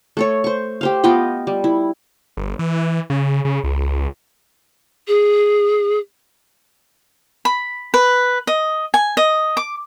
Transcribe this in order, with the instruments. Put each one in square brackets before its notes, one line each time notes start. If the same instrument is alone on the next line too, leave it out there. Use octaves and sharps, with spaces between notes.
[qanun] A3 A4 C#5
C5 C#6
G4 C5 F5
B3 F4 D#5 G5
G3
E4
[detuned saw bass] G1
E3
C#3
C#3
C#2
[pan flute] G#4
[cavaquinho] B5
B4
D#5
G#5
D#5
D6